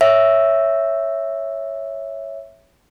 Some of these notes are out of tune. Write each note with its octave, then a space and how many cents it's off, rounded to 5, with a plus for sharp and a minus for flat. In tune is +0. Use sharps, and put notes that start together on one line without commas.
C#5 +0 E5 +0